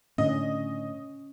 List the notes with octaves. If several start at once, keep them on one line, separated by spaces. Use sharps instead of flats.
A2 D3 C#4 D#5